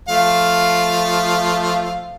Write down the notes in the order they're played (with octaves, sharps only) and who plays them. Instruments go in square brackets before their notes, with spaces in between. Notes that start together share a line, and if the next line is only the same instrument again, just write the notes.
[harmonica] F3 A3 F5